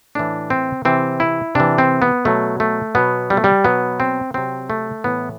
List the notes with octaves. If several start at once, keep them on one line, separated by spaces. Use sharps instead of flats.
A2 E3 D4
C4
C3 E3 C4
E4
C3 E3 D4
C4
B3
B2 F#3 A3
A3
B2 F#3 B3
G3
A3
G3
B2 F#3 B3
C4
C3 F#3 C4
A3
A2 E3 B3